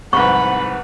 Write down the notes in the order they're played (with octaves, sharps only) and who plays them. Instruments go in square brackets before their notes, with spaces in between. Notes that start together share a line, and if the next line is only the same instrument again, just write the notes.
[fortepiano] C2 G#2 [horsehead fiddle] B4 F#5 [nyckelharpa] B5 [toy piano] C#6